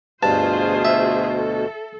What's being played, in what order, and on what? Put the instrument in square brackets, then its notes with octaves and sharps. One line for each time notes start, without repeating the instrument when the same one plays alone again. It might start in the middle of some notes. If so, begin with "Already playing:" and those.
[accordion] D2 B2 [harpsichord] G2 [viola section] F4 G#4 C5 [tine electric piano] A5
[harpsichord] E5
[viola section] A4